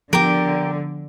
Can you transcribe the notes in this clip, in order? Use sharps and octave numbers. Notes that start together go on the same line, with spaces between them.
D3 F3 B3 G4 A#4